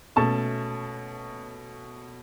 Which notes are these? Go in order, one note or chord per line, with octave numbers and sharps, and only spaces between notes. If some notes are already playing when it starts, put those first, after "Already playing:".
B2 A3 C#4 A5 C#6